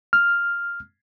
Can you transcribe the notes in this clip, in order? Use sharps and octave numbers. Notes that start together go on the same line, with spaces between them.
F6